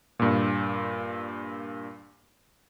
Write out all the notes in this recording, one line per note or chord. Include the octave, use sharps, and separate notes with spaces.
G2 A#2